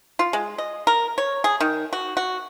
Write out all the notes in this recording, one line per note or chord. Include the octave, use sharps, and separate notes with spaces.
F4
G#3
D#5
A#4
C#5
G#4
D#3
F#4
F#4